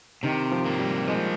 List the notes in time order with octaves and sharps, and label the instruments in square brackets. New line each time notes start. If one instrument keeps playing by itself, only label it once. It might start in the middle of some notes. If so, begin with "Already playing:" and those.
[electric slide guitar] C3 [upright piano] D#3
[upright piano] F3
[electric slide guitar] A#3
[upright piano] G3
[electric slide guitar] F3 [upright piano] G#3